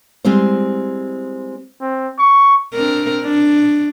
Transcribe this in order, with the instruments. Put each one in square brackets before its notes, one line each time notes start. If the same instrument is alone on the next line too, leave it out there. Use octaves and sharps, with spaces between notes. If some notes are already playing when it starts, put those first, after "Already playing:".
[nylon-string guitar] G3 G#3 C4 E4 C5
[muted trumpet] C4
C#6
[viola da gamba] C4 D4 A#4
D4